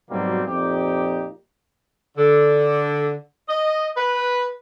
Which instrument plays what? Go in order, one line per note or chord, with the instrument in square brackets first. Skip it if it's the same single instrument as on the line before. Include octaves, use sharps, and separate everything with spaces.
[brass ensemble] G#2 B2 F#3 G3 A#3 C4
F2 A#2 C4 D#4 G4
[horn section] D3
D#5
B4